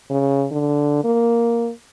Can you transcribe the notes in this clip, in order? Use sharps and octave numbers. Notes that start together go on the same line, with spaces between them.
C#3
D3
A#3